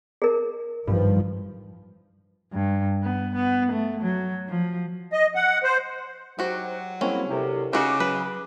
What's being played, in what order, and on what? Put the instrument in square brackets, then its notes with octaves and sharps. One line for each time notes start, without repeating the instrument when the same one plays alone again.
[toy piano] G#4 A#4
[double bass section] G#1 D#3 F3 [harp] G2
[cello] G2
B3
B3
A3
F#3
F3
[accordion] D#5
F#5
C5
[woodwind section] G#2 C5 F#5 [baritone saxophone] F#3 [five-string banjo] F#4 G4
[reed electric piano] G3 A#3 C4 [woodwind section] G#3 E4 [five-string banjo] C#4
[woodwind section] D2 C3 [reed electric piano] E4 G4 A#4
[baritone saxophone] C#3 [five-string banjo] D#4 F#4 [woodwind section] D6
[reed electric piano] F#3 [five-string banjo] B4